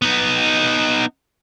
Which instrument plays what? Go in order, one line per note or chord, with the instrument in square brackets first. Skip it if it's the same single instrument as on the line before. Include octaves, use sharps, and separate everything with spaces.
[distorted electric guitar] B3 D#4